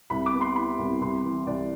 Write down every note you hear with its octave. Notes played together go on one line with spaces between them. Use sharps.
C2 B5
D6
B3
C6
E4 B5
C2
C2 C6
E3
C2 D5